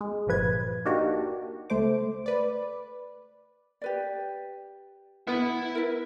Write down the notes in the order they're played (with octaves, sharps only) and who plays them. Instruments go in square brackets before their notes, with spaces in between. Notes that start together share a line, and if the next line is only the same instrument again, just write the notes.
[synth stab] G#3
G1 G2 A#2 F3 B4 G#6
A#3 D4 D#4 F#4 G4
C#2 A3 C5 D6
B4 D5
[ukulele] G4 B4 D5
[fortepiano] B3 [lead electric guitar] E4
[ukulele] A#4 B4